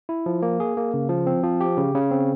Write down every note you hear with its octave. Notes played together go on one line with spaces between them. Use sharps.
E4
F3
A#3
G#4
A#3
C#3
F3
C4
F3
G4
C#3
C#3
C4